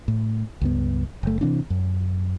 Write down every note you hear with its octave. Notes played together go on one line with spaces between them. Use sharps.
A2
C#2 G2 B3
F#1 A3
C3 E3 C4 D4
F#2